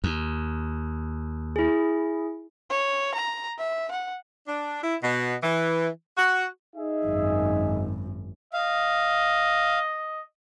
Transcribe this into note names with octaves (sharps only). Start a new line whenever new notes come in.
D#2
E4 G#4
C#5
A#5
E5
F#5
D4
E4
B2
E3
F#4
D#4 G#4 E5
G#1 F#2
D#5 F5